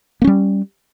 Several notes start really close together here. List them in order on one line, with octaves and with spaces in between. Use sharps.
A#3 C#4 G3